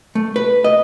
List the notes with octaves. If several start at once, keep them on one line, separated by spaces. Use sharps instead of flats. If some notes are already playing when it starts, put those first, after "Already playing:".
A3
B4
D#5